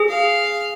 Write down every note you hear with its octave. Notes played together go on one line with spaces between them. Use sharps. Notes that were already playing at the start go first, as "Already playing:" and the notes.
Already playing: G#4
F5